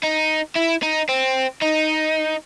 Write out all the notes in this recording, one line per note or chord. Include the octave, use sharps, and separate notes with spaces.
D#4
E4
D#4
C4
D#4